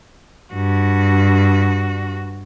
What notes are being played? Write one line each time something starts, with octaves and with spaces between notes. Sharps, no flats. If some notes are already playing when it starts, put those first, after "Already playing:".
G2 F#4